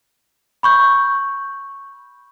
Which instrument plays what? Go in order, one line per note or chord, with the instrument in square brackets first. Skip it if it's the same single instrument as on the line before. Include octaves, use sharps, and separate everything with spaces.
[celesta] B5 C#6 G6